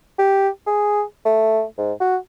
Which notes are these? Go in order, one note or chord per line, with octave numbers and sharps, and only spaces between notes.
G4
G#4
A3
G#2
F#4